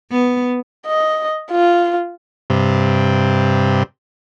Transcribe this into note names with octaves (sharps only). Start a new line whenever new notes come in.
B3
D#5
F4
G2 C3